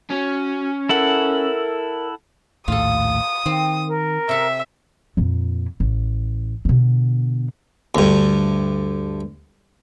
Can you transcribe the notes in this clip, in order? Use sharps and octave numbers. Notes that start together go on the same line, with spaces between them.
C#4 F#4
E4 A4 A#4 F#5
A#1 D#2 A2 F4 A4 D#6
D#3 C4
A#4
C3 A4 E5
F2 A#2
A1
B2 D3
D2 G2